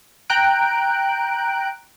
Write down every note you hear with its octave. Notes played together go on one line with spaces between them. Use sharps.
G5 A#5 F#6 D7